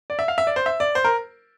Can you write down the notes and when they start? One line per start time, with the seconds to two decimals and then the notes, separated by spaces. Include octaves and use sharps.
0.10 D5
0.19 E5
0.28 F5
0.38 E5
0.47 D5
0.56 C5
0.66 E5
0.80 D5
0.95 C5
1.04 A#4